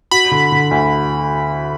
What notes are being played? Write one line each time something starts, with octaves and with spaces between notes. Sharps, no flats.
F#4 B5
D3
D3
D2